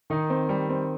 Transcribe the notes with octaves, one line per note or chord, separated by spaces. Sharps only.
D#3 D#4
C4
G3
C4